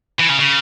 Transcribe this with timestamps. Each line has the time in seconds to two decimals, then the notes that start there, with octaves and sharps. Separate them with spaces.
0.19 E3
0.29 C#3
0.39 C#3